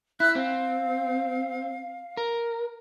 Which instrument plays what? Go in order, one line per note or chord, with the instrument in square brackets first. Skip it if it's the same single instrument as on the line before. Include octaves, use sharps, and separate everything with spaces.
[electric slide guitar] E4 [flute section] E5 E6 F#6
[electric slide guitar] C4 [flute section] F5
[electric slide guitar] A#4